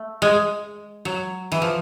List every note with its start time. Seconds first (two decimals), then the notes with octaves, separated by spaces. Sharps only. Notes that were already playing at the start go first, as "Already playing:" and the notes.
Already playing: A3
0.22 G#3
1.05 F#3
1.52 E3
1.62 F3